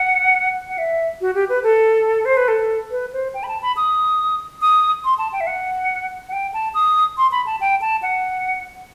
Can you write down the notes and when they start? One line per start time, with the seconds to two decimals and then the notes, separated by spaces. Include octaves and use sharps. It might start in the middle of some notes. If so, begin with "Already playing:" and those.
Already playing: F#5
0.69 F#5
0.78 E5
1.21 F#4
1.35 G4
1.49 B4
1.63 A4
2.25 C5
2.37 B4
2.48 A4
2.91 B4
3.13 C5
3.34 G5
3.43 B5
3.48 A5
3.62 B5
3.77 D#6
4.62 D#6
5.04 C6
5.18 A5
5.33 G5
5.41 E5
5.47 F#5
6.29 F#5
6.33 G5
6.54 A5
6.74 D#6
7.17 C6
7.32 B5
7.46 A5
7.61 G5
7.81 A5
8.02 F#5